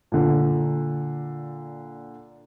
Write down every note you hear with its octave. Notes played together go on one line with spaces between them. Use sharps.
A#2 D3